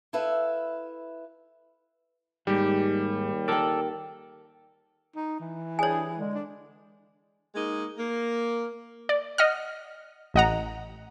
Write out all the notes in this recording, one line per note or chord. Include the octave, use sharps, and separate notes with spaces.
E4 A4 B4 E5 F5
D#2 G#2 G3 G4
A4 A#4 D5 G5
D#4
E3
G3 D4 G#4 C#5 G#5
D3 G#3
D4
G#3 A#3 D#4
A#3
D5
D#5 F#5 F6
A1 D#5 F#5 A#5